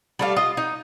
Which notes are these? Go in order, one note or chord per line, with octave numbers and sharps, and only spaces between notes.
G3 A3 F5
F4 D#5
D#4